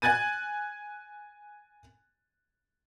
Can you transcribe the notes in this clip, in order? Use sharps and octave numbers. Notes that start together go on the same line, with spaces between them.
G#5 F#6 G#6 A6 D#7